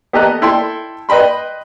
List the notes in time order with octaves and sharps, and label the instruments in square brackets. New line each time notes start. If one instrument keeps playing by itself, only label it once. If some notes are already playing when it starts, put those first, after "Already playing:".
[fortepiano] B3 G4 A4 D#5 A#5 F#6
E4 A4 G5 C6
B4 D#5 G5 B5 C6